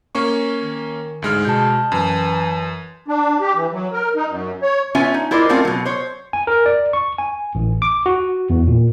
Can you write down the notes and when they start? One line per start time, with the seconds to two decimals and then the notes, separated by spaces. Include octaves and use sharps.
0.15 A#3 C#4 C#6
0.61 D#3
1.22 D2 G#2 G#3 F6
1.45 B2 A5 G6
1.92 F#2 E3
3.08 D4
3.41 G4
3.55 E3
3.73 F#3
3.93 A#4
4.16 D#4
4.29 F#2
4.62 C#5
4.95 B3 C#4 F4 C#5 E5 G#5
5.14 D#4
5.31 E4 F4 A#4 C5 D5 D#5
5.49 A3 C4 C#4 F4 A#4 F5
5.65 B2 F#3
5.85 C5 C#5
6.33 G#5
6.47 A#4
6.66 D5
6.93 C#6
7.18 G#5
7.55 A1
7.82 D6
8.06 F#4
8.50 E2
8.68 A#2